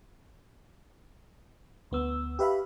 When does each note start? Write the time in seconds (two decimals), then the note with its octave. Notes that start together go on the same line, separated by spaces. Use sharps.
1.91 D2 B3 E6
2.39 G4 B4 E5 F5 B5